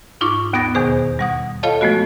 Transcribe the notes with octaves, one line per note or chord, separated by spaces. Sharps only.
G#2 D#4 F4 C#6 D6
D#2 B3 B5 D#6 A6 A#6
E2 B2 D#3 G#4 C5
G3 F#5 D#6
F4 A4 C#5 D#5 F5 A5
F3 G#3 A3 B3 F#4